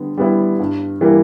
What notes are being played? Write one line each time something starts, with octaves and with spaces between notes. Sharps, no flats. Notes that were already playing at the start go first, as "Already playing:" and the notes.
Already playing: D3 G3 B3
G3 B3 E4
G2
E3 G3 A#3